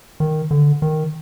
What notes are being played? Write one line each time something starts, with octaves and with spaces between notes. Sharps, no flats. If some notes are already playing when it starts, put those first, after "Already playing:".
D#3
D3
D#3